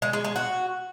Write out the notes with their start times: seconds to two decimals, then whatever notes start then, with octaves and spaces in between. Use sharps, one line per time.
0.02 G#3
0.13 G#3
0.25 G#3
0.36 F#4